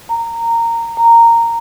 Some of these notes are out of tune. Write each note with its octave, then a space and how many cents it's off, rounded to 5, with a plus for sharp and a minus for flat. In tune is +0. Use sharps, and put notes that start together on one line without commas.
A#5 -15
A#5 -10